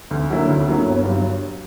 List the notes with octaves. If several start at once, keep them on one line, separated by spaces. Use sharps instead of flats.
D2
D3 F#3 A#3 E4
D2
D3 F#3 A#3 E4
G1
G2 F#3